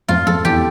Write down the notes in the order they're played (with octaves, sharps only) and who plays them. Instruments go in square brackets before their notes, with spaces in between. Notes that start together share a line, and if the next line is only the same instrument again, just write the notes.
[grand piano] F2 [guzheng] F4
[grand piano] F2 [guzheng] A4
[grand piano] E2 [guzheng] G4